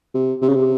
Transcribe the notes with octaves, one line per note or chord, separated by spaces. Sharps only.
C3
C3
C#3
C3